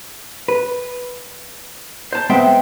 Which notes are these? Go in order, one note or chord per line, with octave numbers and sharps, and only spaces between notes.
B4
C5 A5
G#3 B3 C4 C5 E5 G5